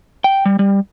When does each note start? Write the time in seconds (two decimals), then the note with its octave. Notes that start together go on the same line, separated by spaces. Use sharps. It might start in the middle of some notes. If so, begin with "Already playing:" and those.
0.24 G5
0.46 G3
0.59 G3